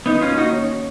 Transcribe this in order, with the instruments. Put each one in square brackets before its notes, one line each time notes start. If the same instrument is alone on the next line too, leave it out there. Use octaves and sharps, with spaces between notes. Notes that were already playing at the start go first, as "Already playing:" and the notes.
[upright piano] D#3 [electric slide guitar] B3 D#4
[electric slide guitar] C#4 F4
[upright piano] A#3
[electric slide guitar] D#4 F#4
[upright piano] C#4